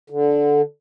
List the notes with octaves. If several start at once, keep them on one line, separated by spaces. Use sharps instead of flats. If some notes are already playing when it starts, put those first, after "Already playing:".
D3